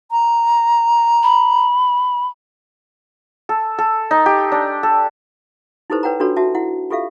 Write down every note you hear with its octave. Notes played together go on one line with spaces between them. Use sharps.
A#5
B5
A4
A4
D#4
G4
D4
A4
D#4 E4 G4 A4 B4 C5
B4 C#5 F#5 G5 A#5
D4 F4 F#4 A4 B4 C#5
F#4 E5 A5
E4 F#5
F4 G4 A4 E5 F5